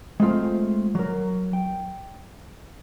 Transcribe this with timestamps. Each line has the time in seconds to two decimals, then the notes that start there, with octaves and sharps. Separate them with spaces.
0.20 G#3 A3 C4 F4 F5
0.95 F#3 A#4
1.53 G5